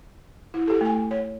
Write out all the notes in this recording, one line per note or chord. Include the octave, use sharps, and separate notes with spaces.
E4
G4 A4
A3 G#5
C#5